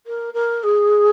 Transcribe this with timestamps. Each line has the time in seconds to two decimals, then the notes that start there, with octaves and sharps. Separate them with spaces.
0.07 A#4
0.34 A#4
0.63 G#4